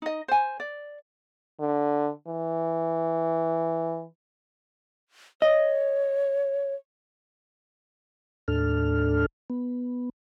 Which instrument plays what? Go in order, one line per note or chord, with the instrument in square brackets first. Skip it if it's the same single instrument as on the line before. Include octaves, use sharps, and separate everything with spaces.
[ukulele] D#4 D#5
C5 G#5
D5
[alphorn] D3
E3
[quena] C#5 [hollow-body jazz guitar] D#5
[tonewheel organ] D#2 A2 D4 A4 F6
B3